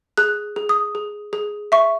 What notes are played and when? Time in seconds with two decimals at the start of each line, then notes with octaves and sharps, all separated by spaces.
0.17 G#4 F#6
0.56 G#4
0.69 D#6
0.95 G#4
1.33 G#4
1.72 E5 C#6